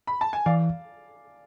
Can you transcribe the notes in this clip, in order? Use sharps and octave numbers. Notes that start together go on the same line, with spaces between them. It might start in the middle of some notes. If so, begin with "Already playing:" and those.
B5
A5
G#5
E3 D5 F5